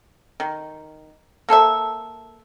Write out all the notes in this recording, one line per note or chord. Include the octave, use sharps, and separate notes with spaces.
D#3
A#3 A4 C5 E5